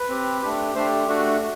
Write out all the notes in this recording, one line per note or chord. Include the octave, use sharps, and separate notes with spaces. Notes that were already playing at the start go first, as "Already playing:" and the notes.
Already playing: B4
C4 G4
A3 D4 G4
A3 D4 G4 C5
A3 D4 F#4